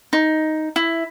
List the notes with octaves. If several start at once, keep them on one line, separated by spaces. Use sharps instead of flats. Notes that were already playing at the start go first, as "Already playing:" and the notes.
D#4
E4